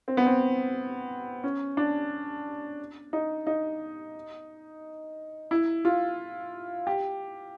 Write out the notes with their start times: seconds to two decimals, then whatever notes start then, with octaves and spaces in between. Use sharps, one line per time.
0.08 C4
0.17 B3
0.26 C4
1.44 C#4
1.77 D4
3.13 D#4
3.47 D#4
5.51 E4
5.85 F4
6.87 G4